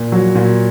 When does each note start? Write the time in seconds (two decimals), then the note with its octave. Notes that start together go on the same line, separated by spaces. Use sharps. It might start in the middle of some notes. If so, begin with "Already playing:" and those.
Already playing: A#2
0.12 F#3
0.35 A#2